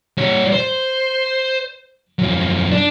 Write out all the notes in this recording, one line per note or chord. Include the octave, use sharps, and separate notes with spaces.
G3 C#5
C5
F#2 F3
D4